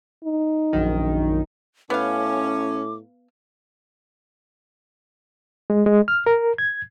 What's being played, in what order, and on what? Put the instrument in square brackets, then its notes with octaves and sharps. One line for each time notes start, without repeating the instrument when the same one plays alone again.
[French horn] D#4
[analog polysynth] A#1 F#2 D#3
[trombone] A2 [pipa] B3 F5 [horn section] C#4 [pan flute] D6
[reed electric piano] G#3
G#3
F6
A#4
G#6